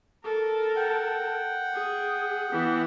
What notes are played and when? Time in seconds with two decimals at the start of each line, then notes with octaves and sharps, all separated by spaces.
0.24 A4 A#4
0.76 F#5 G5
1.74 G#4
2.52 E3 B3